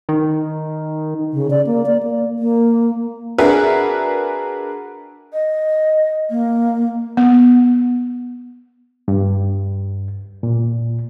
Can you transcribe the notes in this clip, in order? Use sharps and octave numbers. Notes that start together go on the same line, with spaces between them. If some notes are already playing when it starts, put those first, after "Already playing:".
D#3
C#3
D5
A#3
D5
A#3
A#3
D4 F#4 G#4 A#4 B4 E5
D#5
A#3
B3
G2
A#2